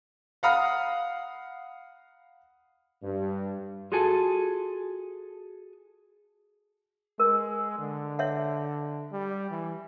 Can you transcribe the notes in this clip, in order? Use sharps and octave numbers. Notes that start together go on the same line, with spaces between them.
F5 F#5 A#5 B5 D#6 F6
G2
F4 F#4 G#4 A4 G#5 A5
G#3 A#4
D3
C#5 E5 F#5
G3
E3